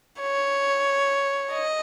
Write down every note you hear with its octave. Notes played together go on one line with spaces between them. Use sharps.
C#5
D#5